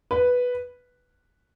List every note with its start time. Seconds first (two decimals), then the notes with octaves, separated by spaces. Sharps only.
0.11 B4